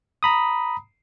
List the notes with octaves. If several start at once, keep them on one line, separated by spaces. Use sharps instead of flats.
A#5 B5 D#6